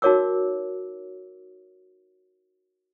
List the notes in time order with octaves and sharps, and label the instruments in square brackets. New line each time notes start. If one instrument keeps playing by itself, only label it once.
[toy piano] D#4 F#4 A#4 C#5 D6 E6